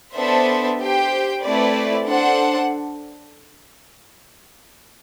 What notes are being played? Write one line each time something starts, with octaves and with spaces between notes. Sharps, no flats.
B3 D4 A4 C5 E5
G4 C5 G5
A3 C4 E4 B4 D5
D4 A4 C5 F#5